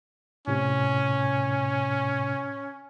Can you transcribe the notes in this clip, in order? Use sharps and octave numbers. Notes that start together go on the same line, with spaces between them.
A2 C3 C#4